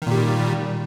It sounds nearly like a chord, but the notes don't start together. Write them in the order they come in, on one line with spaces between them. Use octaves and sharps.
D#3 A#2 G3